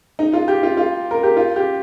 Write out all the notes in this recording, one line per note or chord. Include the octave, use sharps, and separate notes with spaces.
D#4
F4
G4
F4
F4
A#4
G4
F4
G4